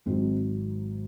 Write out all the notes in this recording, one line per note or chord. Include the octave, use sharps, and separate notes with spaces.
G#1 G#2 F#3 G#3 C4